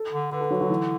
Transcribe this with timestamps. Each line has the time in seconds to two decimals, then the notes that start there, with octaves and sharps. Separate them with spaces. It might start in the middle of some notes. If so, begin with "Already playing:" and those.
Already playing: A4
0.12 D3
0.32 D3 B4
0.41 A4
0.50 F#3
0.61 F#3
0.70 E3